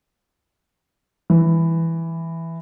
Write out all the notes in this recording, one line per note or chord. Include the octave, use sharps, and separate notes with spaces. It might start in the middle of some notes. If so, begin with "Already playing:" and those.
E3